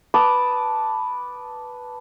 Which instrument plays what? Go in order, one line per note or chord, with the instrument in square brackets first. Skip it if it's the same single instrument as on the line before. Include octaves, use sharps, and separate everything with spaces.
[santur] B4 A5 D6 D#6